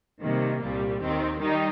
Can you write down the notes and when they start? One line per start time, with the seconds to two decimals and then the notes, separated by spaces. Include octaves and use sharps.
0.21 C3 D#3 G3 A#3
0.61 C2 A#2 G3
1.01 D#2 D#3 C4 G4
1.41 D#3 G3 D#4 G4